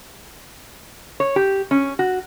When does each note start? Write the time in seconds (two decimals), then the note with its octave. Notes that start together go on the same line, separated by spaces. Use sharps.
1.20 C#5
1.36 G4
1.71 C#4
1.99 F#4